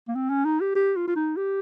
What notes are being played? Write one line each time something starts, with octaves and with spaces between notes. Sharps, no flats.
A#3
C4
C#4
D#4
G4
G4
F4
F4
D#4
G4